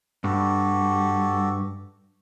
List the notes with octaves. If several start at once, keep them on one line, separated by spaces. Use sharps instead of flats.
G2 F#4 G4 A4